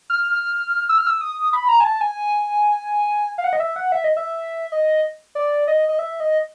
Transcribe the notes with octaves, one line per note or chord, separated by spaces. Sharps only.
F6
E6
F6
E6
D#6
B5
A#5
G#5
A5
G#5
F5
F#5
D#5
E5
F#5
E5
D#5
E5
D#5
D5
D#5
D#5
E5
D#5